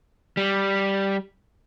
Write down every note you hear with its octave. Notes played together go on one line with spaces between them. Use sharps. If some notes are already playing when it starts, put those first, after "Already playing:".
G3